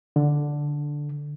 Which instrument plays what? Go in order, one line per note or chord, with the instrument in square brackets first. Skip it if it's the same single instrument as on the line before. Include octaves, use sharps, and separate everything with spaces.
[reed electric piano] D3